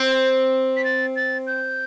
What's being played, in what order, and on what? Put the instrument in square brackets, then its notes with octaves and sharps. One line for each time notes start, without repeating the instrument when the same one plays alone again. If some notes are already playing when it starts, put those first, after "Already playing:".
Already playing: [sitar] C4 [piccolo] G6
[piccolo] B6
A6
A6
G6